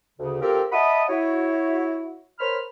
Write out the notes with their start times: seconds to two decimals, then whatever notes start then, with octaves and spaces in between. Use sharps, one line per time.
0.19 D2 C#3
0.42 C4 F4 G4 A4 A#4
0.72 D#5 E5 F#5 A5 B5 D#6
1.09 E4 F#4 C#5
2.40 A#4 C5 C#5 B5 F6